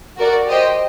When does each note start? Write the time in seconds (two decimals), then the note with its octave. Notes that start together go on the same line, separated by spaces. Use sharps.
0.18 F#4 A#4 D5
0.48 G4 C5 D#5 G5